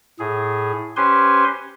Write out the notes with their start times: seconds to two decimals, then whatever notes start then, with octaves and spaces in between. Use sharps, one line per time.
0.19 A2 G#4
0.97 C#4 G4 B4 C5 G#5 C6